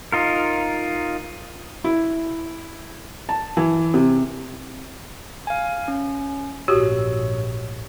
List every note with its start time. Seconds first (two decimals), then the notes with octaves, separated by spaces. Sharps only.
0.12 D#4 F4 A#4
1.84 E4
3.29 A5
3.57 E3
3.94 C3
5.47 F5 G#5
5.88 C#4
6.68 A#1 G#2 F#4 G4 C#5